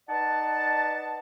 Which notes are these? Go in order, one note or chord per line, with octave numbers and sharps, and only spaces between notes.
D#4 B4 D5 F#5 A5